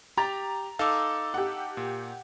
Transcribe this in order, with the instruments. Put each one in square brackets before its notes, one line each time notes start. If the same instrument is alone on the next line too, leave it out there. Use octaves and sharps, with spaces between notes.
[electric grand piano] G4 [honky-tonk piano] A#5 A6
[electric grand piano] D#4 A4 F5 [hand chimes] D6 E6
[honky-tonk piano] G4 F#5
[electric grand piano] A#2